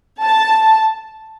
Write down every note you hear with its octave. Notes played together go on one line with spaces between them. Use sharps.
A5